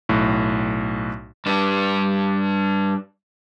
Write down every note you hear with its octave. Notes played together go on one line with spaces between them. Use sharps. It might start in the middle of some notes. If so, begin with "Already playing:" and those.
B1 A2
G2 D4